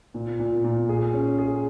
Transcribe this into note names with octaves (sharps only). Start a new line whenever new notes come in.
A#2
A#2
A#2
G#4
C#4
G#4